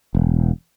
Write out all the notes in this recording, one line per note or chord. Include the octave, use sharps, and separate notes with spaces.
E1